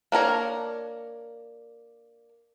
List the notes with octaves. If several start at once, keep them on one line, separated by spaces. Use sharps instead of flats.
A#3 D4 A#4 C#5